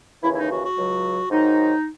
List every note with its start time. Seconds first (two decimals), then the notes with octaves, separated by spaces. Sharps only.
0.23 D#2 C#3 E3 E4
0.33 E4
0.37 D#4
0.50 F#4
0.64 F#4
0.77 C#2 C#3 F#3
1.30 G#2 D#3 F#3 D#4